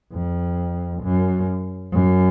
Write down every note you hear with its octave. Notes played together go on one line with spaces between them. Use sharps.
F2
F#2
F#2